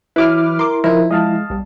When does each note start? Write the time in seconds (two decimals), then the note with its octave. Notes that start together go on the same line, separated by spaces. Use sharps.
0.16 E3 F#3 E4 B4 D6 F6
0.59 A#4 C6 D6
0.84 F3 D#4 E4 A#4 C5
1.11 G#3 D#5 F5 A5
1.50 B1 G3